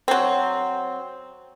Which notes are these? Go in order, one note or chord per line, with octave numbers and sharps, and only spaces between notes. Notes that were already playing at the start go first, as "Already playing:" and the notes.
F#3 C4